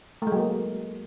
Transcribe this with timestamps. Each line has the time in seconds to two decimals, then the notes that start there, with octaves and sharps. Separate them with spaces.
0.22 A3
0.27 G#3
0.32 F#3
0.37 A#3